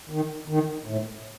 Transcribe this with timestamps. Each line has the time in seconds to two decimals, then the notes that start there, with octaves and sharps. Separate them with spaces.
0.10 D#3
0.48 D#3
0.86 A2